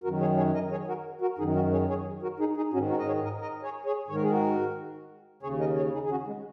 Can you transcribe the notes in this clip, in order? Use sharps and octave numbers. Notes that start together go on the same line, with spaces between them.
F#2 D#3 F#4 A#4
G#4 C#5
G#4 C#5
A#4 D#5
G#4 C#5
F#4 A#4
F#4 A#4
F#2 D#3 D#4 G#4
F#4 A#4
G#4 C#5
G#4 C#5
F#4 A#4
D#4 G#4
D#4 G#4
G#2 D#3 C#4 F#4
F#4 A#4
D#5
G#4 C#5
A#4 D#5
A#4 D#5
G#4 C#5
G#4 C#5
G#2 D#3 C#5
A#4
G#4
F#4 A#4
D#2 C#3 G#4 C#5
A#4 D#5
G#4 C#5
D#4 G#4
G#4
C#4 F#4
G#3